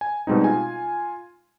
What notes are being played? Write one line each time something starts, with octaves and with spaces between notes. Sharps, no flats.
G#5
B2 G3 G#3 C4 D#4
F4 G#5